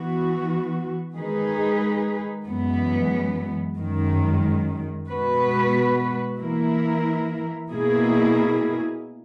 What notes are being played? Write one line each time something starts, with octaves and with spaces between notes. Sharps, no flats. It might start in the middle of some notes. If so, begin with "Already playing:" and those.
Already playing: E3 B3 F#4
D#3 G#3 D#4 G#4 B4
F#2 E3 G#3 B3
F#2 D#3 G#3
B2 G#3 B3 F#4 B4
E3 A#3 E4 A#4
B2 A#3 E4 G#4